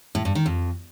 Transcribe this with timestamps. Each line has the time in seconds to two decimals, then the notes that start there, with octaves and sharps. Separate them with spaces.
0.15 A2
0.25 G2
0.35 D#3
0.46 F2